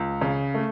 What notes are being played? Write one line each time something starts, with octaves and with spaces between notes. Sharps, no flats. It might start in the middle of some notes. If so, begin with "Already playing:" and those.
Already playing: C#2
C#3
A3